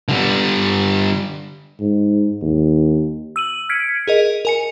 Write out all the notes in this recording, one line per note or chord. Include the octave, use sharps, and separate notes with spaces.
D3 G3
G#2
D#2
E6 D#7 F#7
F6 G#6 B6 C#7 D7
G#4 A#4 D#5
A#4 G#5 C#7